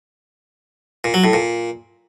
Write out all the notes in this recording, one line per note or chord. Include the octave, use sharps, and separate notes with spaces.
A#2
F#3
A2
A#2